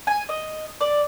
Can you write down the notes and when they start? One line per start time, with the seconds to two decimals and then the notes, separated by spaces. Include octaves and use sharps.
0.07 G#5
0.29 D#5
0.81 D5